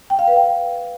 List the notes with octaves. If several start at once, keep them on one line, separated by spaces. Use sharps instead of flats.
G5
F5
B4
G5